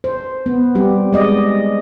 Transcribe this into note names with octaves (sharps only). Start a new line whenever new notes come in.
C5
B3
G3 C4 G4
G#3 D5 D#5